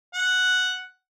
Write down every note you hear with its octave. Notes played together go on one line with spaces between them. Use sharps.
F#5